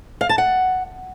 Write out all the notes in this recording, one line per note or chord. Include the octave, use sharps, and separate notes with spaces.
F5
A5
F#5